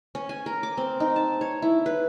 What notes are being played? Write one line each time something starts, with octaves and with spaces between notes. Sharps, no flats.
C#4
G#5
A#4
D6
C4
D#4
A5
C#5
E4
B4